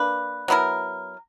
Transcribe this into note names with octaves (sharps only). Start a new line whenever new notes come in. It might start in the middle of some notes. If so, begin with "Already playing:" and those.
Already playing: A#3 D4 B4
F#3 B3 E4 A#4